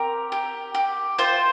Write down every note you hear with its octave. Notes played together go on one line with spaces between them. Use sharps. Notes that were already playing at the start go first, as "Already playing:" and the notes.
Already playing: C4 G4 A#4
G4
G4
F4 C5